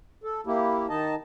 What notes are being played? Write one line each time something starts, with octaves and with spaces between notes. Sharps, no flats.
A4
A#3 E4 G4
D#3 D#4 D#5 A5